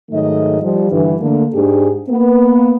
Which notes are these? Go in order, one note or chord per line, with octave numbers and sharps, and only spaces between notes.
G#2 D#3 F#3 A3 D#5
F3 G3
G2 D3 E3
D3 A3 A#3
G#2 D4 G4 G#4
A#3 B3